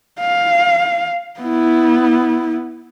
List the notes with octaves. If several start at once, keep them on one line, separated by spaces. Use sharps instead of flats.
F5
B3 E4